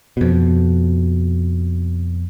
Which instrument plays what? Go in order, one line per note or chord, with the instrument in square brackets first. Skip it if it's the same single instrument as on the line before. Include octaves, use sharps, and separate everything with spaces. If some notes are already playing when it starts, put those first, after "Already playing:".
[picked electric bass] F2 B2